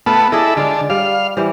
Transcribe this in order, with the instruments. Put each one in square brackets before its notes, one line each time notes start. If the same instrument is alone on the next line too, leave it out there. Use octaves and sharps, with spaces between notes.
[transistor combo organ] A3 B3 [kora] F4
[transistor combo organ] E4 A4 [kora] G#4 D5 D#5
[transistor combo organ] D3 [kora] G#3 F4 F5
[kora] G3 [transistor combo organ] F5
[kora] E3 G3 C5